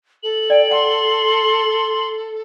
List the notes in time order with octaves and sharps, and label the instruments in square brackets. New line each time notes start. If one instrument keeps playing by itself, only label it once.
[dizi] A4 [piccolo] F#7
[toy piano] D5 [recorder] G5
[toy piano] F#5 [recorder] C6